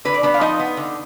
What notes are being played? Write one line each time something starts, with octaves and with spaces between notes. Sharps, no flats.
D3 B4
D5
B3 D4 B4
F5
F3 D#4 D#5
B3
D3